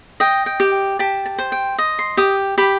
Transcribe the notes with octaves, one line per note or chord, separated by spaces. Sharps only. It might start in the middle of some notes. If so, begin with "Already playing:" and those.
D#5 G5
G5
G4
G4 A5
A5
C5
G5
D#5
C6
G4 D#6
G4 B5